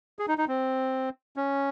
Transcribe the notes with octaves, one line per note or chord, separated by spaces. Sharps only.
G#4
D#4
D#4
C4
C#4